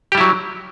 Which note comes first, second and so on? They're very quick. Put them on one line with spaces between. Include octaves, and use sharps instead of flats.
G4 G3 E4 F#3